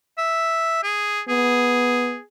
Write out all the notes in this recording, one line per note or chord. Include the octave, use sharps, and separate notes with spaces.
E5
G#4
B3 G#4